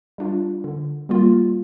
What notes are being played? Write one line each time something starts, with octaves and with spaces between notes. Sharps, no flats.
G3 D4 F4
D3
G3 A#3 F4